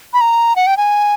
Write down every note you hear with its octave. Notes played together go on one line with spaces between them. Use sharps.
B5
A#5
F#5
G5
G#5